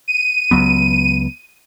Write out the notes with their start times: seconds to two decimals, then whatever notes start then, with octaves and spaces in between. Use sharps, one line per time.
0.08 D#7
0.51 C#2 F#3 B3